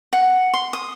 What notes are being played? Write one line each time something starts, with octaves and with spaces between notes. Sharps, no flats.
F#5
C6
D#6